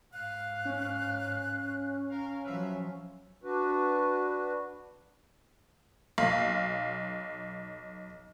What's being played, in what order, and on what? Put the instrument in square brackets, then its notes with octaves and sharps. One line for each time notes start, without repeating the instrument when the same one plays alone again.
[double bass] G#2 [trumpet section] F5 [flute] F#6
[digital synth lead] C#4
[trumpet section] A#4 F5
[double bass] F3 F#3 [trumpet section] B4 E5 F5
[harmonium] D4 F#4 B4
[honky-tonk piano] B1 F5